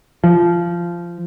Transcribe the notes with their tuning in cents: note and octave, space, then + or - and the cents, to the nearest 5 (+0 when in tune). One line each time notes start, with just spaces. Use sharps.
F3 -15